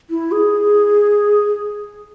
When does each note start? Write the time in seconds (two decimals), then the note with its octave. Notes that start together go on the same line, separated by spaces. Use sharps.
0.10 E4
0.32 G#4